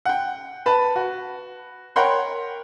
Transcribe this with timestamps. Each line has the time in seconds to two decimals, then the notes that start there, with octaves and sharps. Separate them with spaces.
0.05 F#5 G5
0.66 B4 A5 B5
0.96 F#4
1.96 A#4 C#5 F#5 G5 B5 C6